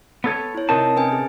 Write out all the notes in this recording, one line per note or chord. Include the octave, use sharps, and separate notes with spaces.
B3 A4 C#5
E4 C#5
C3 C4 D#4 A#4 A5
C#4 B4 G#5
G#4